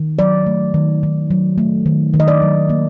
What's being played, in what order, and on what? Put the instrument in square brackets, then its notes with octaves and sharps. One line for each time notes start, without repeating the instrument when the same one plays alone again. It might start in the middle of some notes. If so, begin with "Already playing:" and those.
Already playing: [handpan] D#3
F#3 D5
A3
D#3
D#3
F#3
A3
D#3
D#3
D#5
D5
F#3
A#3